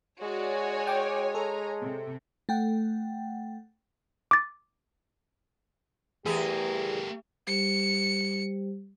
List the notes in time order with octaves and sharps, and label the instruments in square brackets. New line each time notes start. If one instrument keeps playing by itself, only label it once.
[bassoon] G#3 [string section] F#4 D5 [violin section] C#5 G#5
[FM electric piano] G5 D6
[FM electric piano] A4 [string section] A#5
[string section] C3
[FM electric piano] A3 F#5 G5
[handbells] D6 A6
[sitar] E2 G#4 [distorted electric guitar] A3 A#4 [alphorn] G4
[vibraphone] G3 G4 C5 [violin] C#7